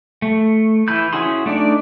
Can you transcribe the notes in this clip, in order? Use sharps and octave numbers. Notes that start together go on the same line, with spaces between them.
A3
E3 E4 B5 G6
C#4 E4 F#4 G#4 C6
A3 D4 D#4 D5